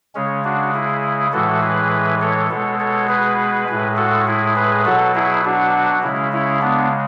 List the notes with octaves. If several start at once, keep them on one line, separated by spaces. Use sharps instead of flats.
C#3 G#3 C#4
D4 F#4
E4 G#4
A2 E3 G#3 F#4 A4
G#4 B4
A4 C#5
B2 G#3 A4 C#5
A4 C#5
G#4 B4
A2 G#3
F#4 A4
E4 G#4
G#4 B4
B2 F#3 F#4 A4
E4 G#4
D4 F#4
C#3 G#3 C#4 E4
C#4 E4
B3 D4